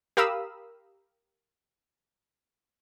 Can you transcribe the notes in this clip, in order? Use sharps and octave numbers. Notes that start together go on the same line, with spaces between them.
G4 A#4 F5 B5 D#6 E6